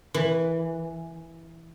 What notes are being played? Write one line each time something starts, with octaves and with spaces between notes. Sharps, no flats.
E3